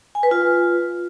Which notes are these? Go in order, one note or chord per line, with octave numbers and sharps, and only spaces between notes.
G#5
B4
F4